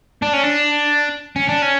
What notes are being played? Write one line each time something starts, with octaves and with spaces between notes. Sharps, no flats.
D4
C#4
D4
C#4
D4
C#4